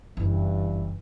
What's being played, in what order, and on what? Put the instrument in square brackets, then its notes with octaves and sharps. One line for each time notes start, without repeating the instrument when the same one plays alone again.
[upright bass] F#1 [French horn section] G2 E3